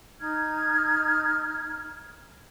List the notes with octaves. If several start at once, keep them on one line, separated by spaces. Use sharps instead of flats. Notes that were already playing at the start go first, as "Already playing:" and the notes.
D#4 F6 G#6